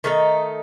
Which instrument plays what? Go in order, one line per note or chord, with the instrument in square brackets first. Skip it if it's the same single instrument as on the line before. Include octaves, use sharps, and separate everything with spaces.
[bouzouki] D#3 A3 D#4 A4